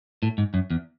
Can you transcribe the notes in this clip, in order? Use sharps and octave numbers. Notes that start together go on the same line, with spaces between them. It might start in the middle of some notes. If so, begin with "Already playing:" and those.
A2
G#2
F#2
E2